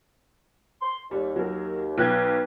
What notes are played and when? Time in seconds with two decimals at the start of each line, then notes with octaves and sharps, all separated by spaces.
0.82 C6
1.11 D#2 G3
1.36 F#3 A#4
1.98 B1 B4 G5 F#6 G#6